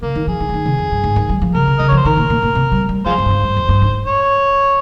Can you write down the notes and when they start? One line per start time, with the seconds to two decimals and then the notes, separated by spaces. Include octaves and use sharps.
0.02 C#3 A#3
0.15 D#3
0.27 F3 G#4
0.40 D#3
0.49 F3
0.54 D#3
0.66 C3
0.78 F2
0.91 G2
1.04 G#2
1.16 D#3
1.29 G3
1.42 F3
1.54 C#3 A#4
1.67 C3
1.79 C#3 D#5
1.88 C#5
1.92 F3 C5
2.05 D#3 A#4
2.17 A#2
2.30 A#2
2.42 A#2
2.55 C3
2.72 G3
2.89 G3
3.06 F3 F4 G#4 C5
3.18 G#2
3.26 G2
3.30 G#2
3.43 G2
3.57 F2
3.69 G2
3.82 G#2
4.07 C#5